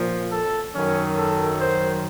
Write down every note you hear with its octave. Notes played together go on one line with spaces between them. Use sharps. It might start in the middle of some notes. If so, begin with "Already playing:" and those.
Already playing: A#2 F3
A4
F#2 D#3 F#3 C#4
A4
C5